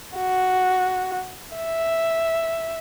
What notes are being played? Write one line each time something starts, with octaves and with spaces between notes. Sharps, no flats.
F#4
E5